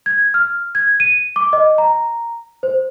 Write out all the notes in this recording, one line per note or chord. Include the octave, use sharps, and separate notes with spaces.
G#6
F6
G#6
D#7
D6
D#5
A#5
C5